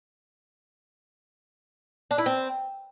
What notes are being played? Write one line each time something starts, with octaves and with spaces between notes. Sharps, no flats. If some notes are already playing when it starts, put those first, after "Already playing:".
D4
E4
C4